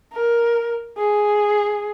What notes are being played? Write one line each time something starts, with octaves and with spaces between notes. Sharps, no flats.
A#4
G#4